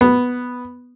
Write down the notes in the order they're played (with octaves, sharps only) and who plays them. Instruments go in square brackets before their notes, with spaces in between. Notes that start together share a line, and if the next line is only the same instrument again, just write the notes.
[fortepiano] B3